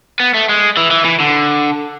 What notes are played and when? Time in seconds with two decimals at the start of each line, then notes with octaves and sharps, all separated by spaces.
0.20 B3
0.34 A3
0.49 G#3
0.77 E3
0.91 E3
1.05 E3
1.20 D3